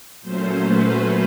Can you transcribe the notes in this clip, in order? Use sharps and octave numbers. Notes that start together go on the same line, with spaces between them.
A#2 F#3 A3 C#4 C5
B4